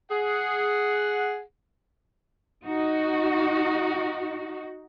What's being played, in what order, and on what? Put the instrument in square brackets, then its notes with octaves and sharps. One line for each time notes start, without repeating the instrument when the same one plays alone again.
[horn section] G#4 F#5
[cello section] D#4 F#4